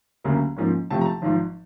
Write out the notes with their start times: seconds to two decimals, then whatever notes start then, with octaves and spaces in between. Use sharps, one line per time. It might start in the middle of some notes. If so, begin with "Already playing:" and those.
0.24 D2 C#3 F#3 A#3 C#4
0.57 G#2 F3 A#3 C#4
0.90 C#2 C3 F3 A3 C4 A5
1.01 A#5
1.06 A5
1.22 G#1 G#2 F3